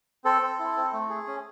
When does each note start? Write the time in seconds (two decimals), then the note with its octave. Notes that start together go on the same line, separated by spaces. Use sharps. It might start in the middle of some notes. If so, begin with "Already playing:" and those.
0.25 C4 A4
0.42 C4
0.59 E4
0.76 C4
0.93 A3
1.09 G#4
1.27 C#4